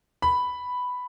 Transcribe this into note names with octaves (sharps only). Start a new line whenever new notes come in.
B5